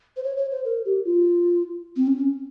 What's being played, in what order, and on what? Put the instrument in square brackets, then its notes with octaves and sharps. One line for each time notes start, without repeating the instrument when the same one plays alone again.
[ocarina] C5
C#5
C#5
C5
A#4
G4
F4
C4
C#4